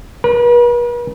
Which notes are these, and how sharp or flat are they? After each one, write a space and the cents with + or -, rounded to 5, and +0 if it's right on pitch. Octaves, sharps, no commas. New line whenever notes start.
B4 -45